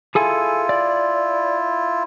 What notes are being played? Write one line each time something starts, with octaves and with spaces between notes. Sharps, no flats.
E4 F4 G#4 A4 G#5
D5